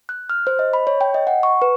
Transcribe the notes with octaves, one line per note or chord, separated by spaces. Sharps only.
F#6
F6
C5
D#5
B5
C#5
G5
D#5
F#5
C#6
B4